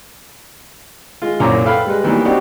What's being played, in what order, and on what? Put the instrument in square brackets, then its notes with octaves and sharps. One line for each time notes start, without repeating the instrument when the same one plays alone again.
[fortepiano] G#3 F4
C2 F#2 A#2 C#5 A#5 D6
A4 B4 F5 G5 B5
G3 G#3 B4
D#3 E3 F#3 G3 A#3 B3
B3 C4 D4 D#4 F#4 G4